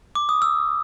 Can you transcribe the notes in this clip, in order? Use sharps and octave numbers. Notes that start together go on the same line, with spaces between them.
D6
D#6
E6